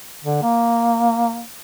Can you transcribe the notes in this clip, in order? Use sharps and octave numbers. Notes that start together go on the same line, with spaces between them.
D3
A#3